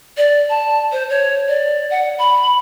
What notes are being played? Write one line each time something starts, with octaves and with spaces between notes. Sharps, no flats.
D5
A5
C5
C#5
D5
F#5
B5